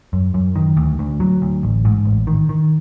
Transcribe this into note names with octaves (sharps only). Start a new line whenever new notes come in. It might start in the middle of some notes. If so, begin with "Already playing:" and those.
F#2
F#2
D#3
D2
D2
F#3
D2
A1
G#2
A1
D#3
D#3